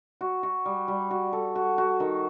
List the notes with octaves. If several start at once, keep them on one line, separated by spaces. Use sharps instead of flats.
F#4
F#4
G3
G3
F#4
A4
F#4
F#4
D#3